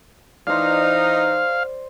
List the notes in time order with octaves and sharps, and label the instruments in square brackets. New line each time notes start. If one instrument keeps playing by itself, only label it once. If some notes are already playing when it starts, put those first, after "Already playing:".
[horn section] E3 D#4 [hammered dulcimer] C5 D5 [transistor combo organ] F5